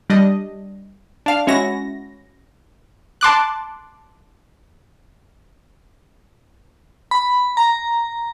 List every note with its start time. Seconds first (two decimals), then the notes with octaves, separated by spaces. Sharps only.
0.10 G3 D4 D#5
1.26 D4 F5
1.47 G#3 C#4 E4 F#4 A#6
3.21 A5 C6 D6 F#6
7.11 B5
7.57 A#5